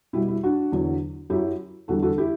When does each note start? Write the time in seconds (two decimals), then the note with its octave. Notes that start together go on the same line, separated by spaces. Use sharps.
0.13 B2 G3 E4
0.28 E4
0.43 D4 F#4
0.72 E2 D3 F#3
1.30 F#2 E4 G4
1.35 F#3
1.88 E2 D3 G3 F#4 A4
2.03 F#4 A4
2.18 E4 G4